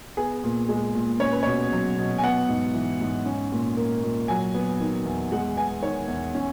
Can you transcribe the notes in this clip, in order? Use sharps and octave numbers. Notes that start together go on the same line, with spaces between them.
B3 G#4
A#2
G#3
A#2
C#4 C#5
B4
B2 C#5
F#3
B2
G#5
B3 F#5
G#2
E3
G#2
C#4
A#2
A#3
A#2
F#3 G#5
B3
D#3
E2
G#3 F#5
B3 G#5
D#3 C#5
E2
C#4